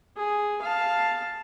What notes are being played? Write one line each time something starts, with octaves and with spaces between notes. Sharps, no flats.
G#4
F5 A5